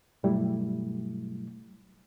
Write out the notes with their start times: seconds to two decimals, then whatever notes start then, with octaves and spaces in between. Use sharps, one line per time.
0.23 G2 B2 F#3 G3 A3 E4